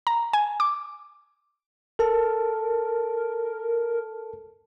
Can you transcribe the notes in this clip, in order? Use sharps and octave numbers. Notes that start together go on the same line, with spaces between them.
A#5
G#5
D6
A4 A#4 A5